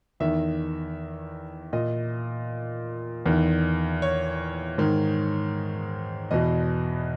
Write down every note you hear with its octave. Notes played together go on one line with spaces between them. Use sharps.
E2 D#3 E5
A#2 D#5
E2 D#3
C#5
G#2 D#3
E2 B2 D#5